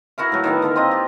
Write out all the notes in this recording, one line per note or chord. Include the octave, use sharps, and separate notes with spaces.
E4 F#4 A#4 F5
A2 F#3
D#3 B3 F5
D3 A#3 A#4
C4 F4 D#5
G4